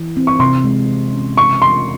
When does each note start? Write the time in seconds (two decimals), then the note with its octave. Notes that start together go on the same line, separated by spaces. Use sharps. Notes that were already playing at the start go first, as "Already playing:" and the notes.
Already playing: E3
0.17 C4
0.27 C#6
0.40 C3 C6
0.64 G#3
0.88 E3
1.13 C#4
1.36 C#3 C#6
1.61 E3 C6